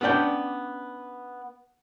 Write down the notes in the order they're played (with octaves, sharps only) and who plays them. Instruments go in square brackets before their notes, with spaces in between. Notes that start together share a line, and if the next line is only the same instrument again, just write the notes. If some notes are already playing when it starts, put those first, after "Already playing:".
[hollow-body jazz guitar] B3 C#4 D4 D5 G5